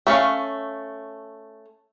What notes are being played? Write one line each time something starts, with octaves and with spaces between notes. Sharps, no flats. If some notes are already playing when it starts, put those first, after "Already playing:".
A3 C#4 F5